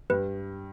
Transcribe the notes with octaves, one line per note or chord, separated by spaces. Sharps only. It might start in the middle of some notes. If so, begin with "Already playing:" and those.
G2 B4